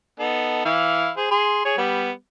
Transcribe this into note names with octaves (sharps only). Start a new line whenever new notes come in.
B3 D#4 A4
E3 E4 F5
G#4 C5
G#4 C6
G#4 C#5
G3 B3